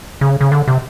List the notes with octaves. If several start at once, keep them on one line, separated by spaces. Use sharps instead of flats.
C#3
C#3
D3
C3